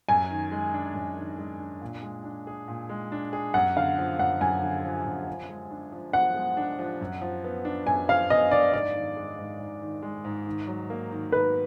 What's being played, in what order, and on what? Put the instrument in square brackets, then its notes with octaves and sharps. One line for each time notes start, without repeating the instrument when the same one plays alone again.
[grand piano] F#2 [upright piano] G#5
[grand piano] D#3
G#3
D4
F#2
D#3
G#3
D4
A#2
G#3
D4
G#4
A#2
G#3
D4
G#4
[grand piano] F#2 [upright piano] F#5
[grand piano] D3 [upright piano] F5
[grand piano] F3
[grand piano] F#2 [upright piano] F#5
[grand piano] F#2 [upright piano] G#5
[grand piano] D3
F3
F#2
F3
G#3
D4
F3
[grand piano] F3 [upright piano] F#5
[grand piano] G#3
D4
F3
F#2
F3
B3
D4
[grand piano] F#2 [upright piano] G#5
[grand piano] F3 [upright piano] F5
[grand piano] B3 [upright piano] D#5
[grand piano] D4 [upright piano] D5
[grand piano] G#2 [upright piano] D5
[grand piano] D#3
G#3
G#2
G#2
D#3
G#3
G#2
D#3
F#3
A#3
D#3
[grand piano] D#3 [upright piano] B4